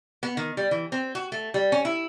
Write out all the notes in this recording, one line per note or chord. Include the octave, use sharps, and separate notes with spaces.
B3
D#3
G3
E3
C4
F#4
A3
G3
C#4
E4